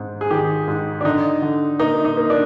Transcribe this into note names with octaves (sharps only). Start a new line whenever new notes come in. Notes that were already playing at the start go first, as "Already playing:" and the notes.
Already playing: G#2 C4
G#4
D#3 G4
G#2
D4
D3 D#4
D3
A#3 D#4
D#4
A#3
D4